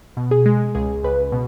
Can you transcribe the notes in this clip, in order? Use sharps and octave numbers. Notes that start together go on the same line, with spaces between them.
B2
G#4
G#3
C#2 G#4
C#2 B4
B2